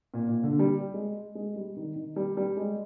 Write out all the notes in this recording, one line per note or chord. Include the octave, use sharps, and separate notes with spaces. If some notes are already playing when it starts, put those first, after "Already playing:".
A#2
A#2
D3
G3
G#3
G#3
G3
D#3
D#3
G3
G3
G#3